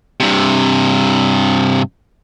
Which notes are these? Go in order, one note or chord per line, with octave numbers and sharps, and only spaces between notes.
G2 C3